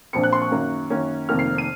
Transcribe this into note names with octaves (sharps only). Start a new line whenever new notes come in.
A#1 A#2 F3 C4 C#7
F#6
C6
C#6
F#2 D#3 A#3 C#4
F#2 D#3 A#3 C#4
F1 F2 D#3 A#3 F6
C7
D#7